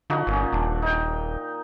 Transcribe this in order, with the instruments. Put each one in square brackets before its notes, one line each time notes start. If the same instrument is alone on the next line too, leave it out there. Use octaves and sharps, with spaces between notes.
[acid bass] D3 [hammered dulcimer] F3 D#4 F#4
[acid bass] G1 [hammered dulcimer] A#2 C#4
[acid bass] D#1 [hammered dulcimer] D4
[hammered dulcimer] D#4 G5